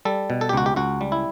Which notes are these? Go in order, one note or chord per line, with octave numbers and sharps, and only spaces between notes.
G3 A4
B2
A4
G4
C#2 F#4
G4
C#2 F#4
G3
E4